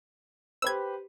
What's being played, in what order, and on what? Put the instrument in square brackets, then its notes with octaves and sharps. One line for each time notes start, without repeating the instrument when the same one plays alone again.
[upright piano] G4 B4 C5 [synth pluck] E6 G#6